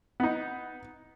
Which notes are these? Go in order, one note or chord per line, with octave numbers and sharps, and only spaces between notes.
B3 D#4